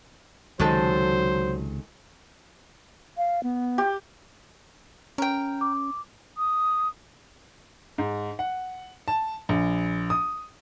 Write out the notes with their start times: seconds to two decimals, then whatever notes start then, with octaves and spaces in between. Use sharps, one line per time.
0.59 C#2 C3 D#3 F#3 G#3 A4 C5
3.17 F5
3.43 B3
3.78 G4
5.18 C#4 A#4 G5
5.61 D6
6.38 D#6
7.98 G#2
8.39 F#5
9.08 A5
9.49 A#1
10.10 D#6